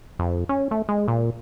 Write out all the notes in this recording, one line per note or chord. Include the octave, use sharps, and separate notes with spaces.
F2
C#4
A3
G#3
A#2